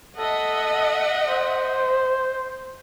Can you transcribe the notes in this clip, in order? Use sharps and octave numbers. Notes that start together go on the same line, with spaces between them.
A4 D#5 E5 F#5
C5